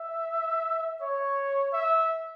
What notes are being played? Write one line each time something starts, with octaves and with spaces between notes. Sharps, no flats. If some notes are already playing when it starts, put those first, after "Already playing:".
Already playing: E5
C#5
E5